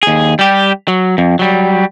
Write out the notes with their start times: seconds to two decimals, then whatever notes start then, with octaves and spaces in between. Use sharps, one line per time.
0.03 D#2 G#4
0.39 G3 G4
0.88 F#3
1.18 F2
1.39 F#3 G3